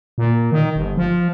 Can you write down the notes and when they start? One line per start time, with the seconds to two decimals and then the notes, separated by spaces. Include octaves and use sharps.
0.18 A#2
0.52 D#3
0.76 G1
0.97 F3